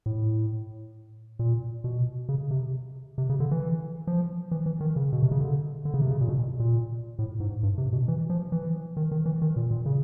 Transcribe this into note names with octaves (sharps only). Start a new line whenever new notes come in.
A2
A#2
B2
C#3
C3
C3
C#3
D3
E3
F3
E3
E3
D#3
C#3
B2
C3
C#3
D3
D3
C#3
C3
C#3
A#2
B2
A#2
A2
G#2
G2
C3
B2
E3
F3
E3
D#3
D#3
E3
D#3
A#2
A#2
C#3